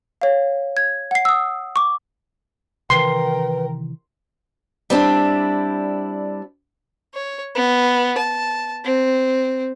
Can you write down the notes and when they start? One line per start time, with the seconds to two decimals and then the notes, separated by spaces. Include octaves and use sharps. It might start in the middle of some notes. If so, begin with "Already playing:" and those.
0.22 C#5 F5
0.77 G#6
1.11 F#5 C7
1.25 D#6 E6
1.76 C#6 D6
2.90 C3 D#3 E3 A#4 B4 G5 C6
4.90 G3 C4 D4 E4
7.14 C#5
7.55 B3
8.18 A5
8.85 C4